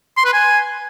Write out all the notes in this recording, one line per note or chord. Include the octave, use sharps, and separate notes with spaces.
C6
B4
G#5